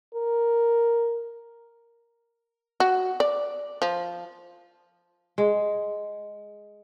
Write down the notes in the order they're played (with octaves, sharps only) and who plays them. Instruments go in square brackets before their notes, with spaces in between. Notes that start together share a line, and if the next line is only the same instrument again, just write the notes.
[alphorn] A#4
[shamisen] F#4
D5
F3
[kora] G#3